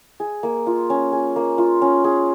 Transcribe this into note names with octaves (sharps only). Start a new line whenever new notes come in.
G#4
A#3
F4
C#4
G#4
A#3
F4
C#4
G#4